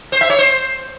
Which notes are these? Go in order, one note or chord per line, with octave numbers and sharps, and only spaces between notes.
C5
E5
C#5
C5